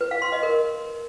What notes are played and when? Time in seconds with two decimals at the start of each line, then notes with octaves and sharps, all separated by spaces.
0.01 B4
0.11 F5
0.22 C6
0.32 D#5
0.43 A#4